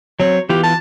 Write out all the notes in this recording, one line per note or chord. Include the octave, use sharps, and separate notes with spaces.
F#3 C4 C#5
E3 B3 F4 G4
A5